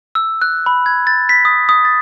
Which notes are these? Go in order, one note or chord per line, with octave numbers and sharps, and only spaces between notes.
E6
F#6
B5
G#6
A6
B6
D#6
D#6
A6